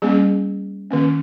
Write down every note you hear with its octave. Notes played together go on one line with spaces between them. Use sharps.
G3 A#3 C#4 G#4
D#3 A#3 C#4